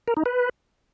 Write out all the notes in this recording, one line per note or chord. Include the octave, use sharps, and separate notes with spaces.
A#4
D#4
B4